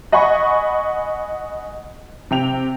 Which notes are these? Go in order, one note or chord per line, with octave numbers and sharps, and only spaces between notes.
D#5 F#5 G#5 B5 C#6
C3 G5 F7